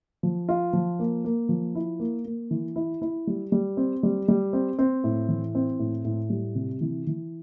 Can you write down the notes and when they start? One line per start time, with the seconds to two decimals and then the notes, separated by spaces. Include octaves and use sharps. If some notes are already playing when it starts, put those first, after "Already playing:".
0.23 F3
0.49 F4
0.73 F3
0.99 A#3
1.25 A#3
1.49 F3
1.75 E4
1.99 A#3
2.25 A#3
2.51 E3
2.76 E4
3.02 E4
3.27 G3
3.52 G3
3.77 C4
4.03 G3
4.28 G3
4.53 C4
4.79 C4
5.04 A2
5.29 E3
5.55 C4
5.79 A2
6.05 A2
6.30 G3
6.55 C3
6.81 E3
7.07 E3